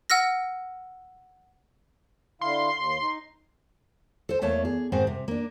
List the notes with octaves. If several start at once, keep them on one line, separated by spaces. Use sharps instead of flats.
F#5 E6 F6 A#6
D3 E4 F5 C6
D#2
D#4
A4 C5
E2 A3 A#3 C#5 A5
G#4
G#2 D#3 C4 C5 F#5
C3
A#3 D4